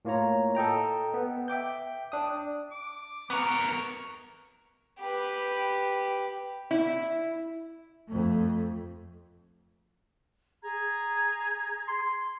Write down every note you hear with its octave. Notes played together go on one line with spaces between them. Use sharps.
A2 A#3 F4 C#5 A#5
A4 D#5 G5 A#5
B3
E5 G5 D6 G6
D4 D#6
D6
B3 A#4 C#6
G4 B4
E4
F2 A3
G#4 A#5 G#6
C6